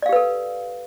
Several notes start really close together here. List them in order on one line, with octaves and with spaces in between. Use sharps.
D5 F5 G4 B4 A4